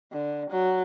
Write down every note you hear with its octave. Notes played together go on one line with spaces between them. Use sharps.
D3
F#3